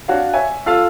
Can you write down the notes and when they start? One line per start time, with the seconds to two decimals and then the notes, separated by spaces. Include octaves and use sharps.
0.08 D4 F#4 C#5 F5
0.34 C#5 E5 G#5
0.66 F4 A4 F5 E6